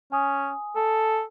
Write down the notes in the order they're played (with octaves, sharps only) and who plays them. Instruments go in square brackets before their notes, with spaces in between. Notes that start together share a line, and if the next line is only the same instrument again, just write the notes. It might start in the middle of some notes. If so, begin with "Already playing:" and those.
[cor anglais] C#4 [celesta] G#5 D#6
[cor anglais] A4